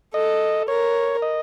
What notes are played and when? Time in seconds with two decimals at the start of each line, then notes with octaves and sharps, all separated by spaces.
0.13 A4 D#5
0.68 A#4 C#5
1.22 D#5